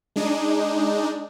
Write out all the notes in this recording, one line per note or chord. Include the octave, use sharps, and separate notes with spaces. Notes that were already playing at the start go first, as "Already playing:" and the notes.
G#3 D4 D#4